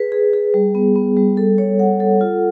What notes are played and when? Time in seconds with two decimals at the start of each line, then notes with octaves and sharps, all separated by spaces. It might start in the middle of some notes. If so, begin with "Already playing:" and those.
Already playing: G#4 B4
0.12 G#4
0.33 G#4
0.54 G3
0.75 B3
0.96 B3
1.17 G3
1.37 A4
1.58 C#5
1.79 F#5
2.00 A4
2.21 F4